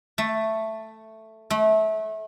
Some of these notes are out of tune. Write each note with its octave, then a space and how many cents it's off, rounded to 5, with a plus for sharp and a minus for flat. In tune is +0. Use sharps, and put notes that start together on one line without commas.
A3 +5
A3 -25